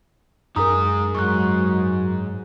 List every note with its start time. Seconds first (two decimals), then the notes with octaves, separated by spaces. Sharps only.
0.56 F#2 D#4 G#4 A#4 G#5 A#5 D#6
1.15 G#2 F#3 C#6 F#6